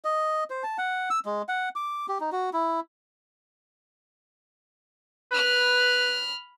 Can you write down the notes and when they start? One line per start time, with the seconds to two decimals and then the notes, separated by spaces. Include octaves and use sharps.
0.04 D#5
0.50 C5
0.63 A5
0.78 F#5
1.10 E6
1.25 G#3
1.48 F#5
1.76 D6
2.08 G4
2.20 D#4
2.32 F#4
2.53 E4
5.32 B4 B5 F6